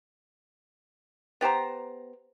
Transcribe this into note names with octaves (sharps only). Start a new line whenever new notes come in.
B3 G4 C5 A#5